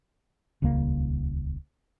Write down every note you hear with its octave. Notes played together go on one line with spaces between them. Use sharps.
D#1 C#2 C#3 A#3